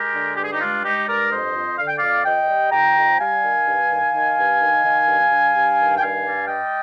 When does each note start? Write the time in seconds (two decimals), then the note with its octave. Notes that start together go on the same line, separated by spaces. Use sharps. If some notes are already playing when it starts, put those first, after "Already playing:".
Already playing: G#3 G4 A#4
0.14 D3
0.37 G2 G4
0.44 G#4
0.53 D#4 G4
0.60 G#3 D4 F4
0.84 G#3 D#4 G4
1.07 G2 A#4 D5
1.31 F2 C5 D#5
1.55 F2
1.78 D3 F5
1.88 G5
1.97 F2 D5 F5
2.25 F2 D#5 G5
2.49 G3
2.72 F2 G5 A#5
2.96 F2
3.19 G3 F5 G#5
3.42 D#3
3.66 G2
3.90 D#3
4.14 D#3
4.37 G2
4.60 D#3
4.84 D#3
5.07 G2
5.30 G2
5.54 G2
5.78 D#3
5.97 G5
6.01 G2 F5 G#5
6.25 G3
6.48 G3 D#5 G5